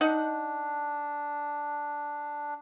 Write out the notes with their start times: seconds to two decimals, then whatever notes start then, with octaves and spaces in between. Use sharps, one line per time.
0.01 D4 D#4 F#5